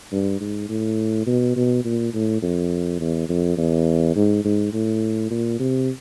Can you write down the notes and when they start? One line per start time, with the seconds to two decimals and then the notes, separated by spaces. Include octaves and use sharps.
0.12 G2
0.41 G#2
0.69 A2
1.26 B2
1.56 B2
1.85 A#2
2.14 A2
2.42 F2
3.00 E2
3.29 F2
3.58 E2
4.16 G#2
4.45 G#2
4.73 A2
5.31 A#2
5.60 C3